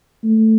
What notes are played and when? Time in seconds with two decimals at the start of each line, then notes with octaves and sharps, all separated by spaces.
0.24 A3